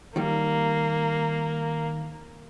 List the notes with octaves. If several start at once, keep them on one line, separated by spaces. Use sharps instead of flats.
D#3 G3 A#3